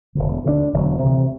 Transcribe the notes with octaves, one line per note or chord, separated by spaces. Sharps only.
E1 D2 D3
D2 D3 A3 D4
E1 D2 D3 F#3
D2 C3 E3